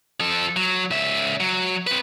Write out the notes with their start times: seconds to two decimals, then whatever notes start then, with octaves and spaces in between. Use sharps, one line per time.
0.20 F3 A4
0.56 F#3
0.91 C#2 E5
1.40 F#3
1.87 C4 B4